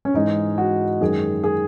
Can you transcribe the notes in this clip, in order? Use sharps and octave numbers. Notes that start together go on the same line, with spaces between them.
C#4
G#2 E3 G#3 D#4
F#4
F#2 D#3 G#3 G#4
G#4